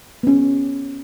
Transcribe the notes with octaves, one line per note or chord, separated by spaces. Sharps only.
B3 C#4